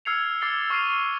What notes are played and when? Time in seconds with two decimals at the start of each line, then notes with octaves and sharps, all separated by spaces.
0.05 E6 F6 G#6 C7 C#7 F7
0.41 D6 E6 A6 C7 G7
0.70 C#6 E6 F6 C7 D#7 F7